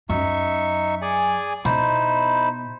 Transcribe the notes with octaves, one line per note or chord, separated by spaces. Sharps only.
F#2 D#4 E5 C#6
G#4 D5 G#5
B2 D#4 E4 C5